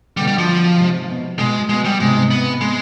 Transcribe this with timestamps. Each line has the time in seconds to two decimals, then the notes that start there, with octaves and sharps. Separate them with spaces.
0.17 B2 D3 G3
0.27 G3
0.38 F3
0.78 G#2 C3
1.09 B2
1.39 B2 G#3
1.69 B2 G#3
1.85 G3
2.00 G#2 C3 G#3
2.31 B3
2.61 G#3